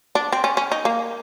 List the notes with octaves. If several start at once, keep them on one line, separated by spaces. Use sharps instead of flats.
D4
C4
C#4
C#4
D#4
A#3